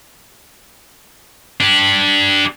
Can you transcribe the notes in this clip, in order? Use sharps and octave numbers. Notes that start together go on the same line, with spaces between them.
D4 G4